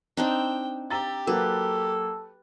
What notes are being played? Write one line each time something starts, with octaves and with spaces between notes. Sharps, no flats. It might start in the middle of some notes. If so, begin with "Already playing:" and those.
C4 D4 D#4 G5
G4 A#5 E6 A6
F#3 A#3 F#4 A4 B4